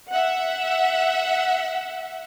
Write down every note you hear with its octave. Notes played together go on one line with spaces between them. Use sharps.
E5 F#5